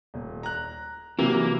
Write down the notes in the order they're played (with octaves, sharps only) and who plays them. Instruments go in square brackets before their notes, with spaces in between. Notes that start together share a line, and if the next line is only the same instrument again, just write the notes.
[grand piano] D#1
A#5 F#6
[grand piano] C3 E3 F#3 [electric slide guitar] A#3